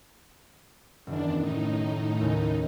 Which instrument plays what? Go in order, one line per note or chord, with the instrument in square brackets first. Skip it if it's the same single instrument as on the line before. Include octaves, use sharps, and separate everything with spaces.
[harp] F#1 D#3 [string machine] E2 D4
[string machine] A2 D#4
[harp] D#2 C#3